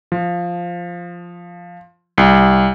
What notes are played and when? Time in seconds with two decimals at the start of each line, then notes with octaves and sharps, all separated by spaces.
0.12 F3
2.18 C2